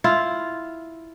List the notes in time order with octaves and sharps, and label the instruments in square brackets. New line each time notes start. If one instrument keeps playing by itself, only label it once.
[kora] E4 F4